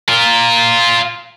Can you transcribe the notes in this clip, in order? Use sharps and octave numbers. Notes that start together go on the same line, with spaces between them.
F4 A#4